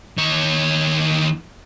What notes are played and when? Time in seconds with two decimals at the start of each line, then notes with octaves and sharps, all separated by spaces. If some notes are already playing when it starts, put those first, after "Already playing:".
0.18 D#2 C#5